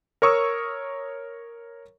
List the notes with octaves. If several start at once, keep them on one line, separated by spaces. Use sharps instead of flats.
A#4 C#5 C#6 D#6 E6